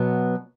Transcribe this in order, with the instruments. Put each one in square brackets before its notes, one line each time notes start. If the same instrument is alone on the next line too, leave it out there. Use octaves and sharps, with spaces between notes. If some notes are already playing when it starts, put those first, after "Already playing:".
Already playing: [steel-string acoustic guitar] B2 F#3 B3